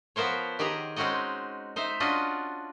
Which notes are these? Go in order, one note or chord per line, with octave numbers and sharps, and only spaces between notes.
F3 B3 A#4 C5 C#5
D#3 G4 G#4 A#5
G#3 C4 C#4 D#4 F#4 D#5
D#4 C5 E5
C#4 D4 F4 F#4 D#5